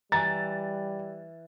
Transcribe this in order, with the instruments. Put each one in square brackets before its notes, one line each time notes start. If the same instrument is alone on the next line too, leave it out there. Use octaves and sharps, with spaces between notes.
[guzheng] E3 [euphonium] G3 [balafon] A#5 [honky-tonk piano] A6